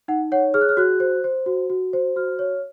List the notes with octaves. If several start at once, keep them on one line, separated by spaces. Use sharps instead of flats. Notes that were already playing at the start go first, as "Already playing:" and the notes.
D#4 F#5
C#5 F#5
G#4 F6
F#6
F6
F#4 F#6
C5
C5
F#4
F#4
C5
F#4 F6
C#5